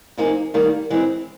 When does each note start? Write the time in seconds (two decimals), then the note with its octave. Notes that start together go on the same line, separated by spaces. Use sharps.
0.17 C3 F3 A#3 D#4 G#4
0.54 D#3 G3 A#3
0.90 E3 G#3 C4